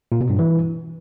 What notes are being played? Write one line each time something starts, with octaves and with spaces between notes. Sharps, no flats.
A#2
B2
G2
E3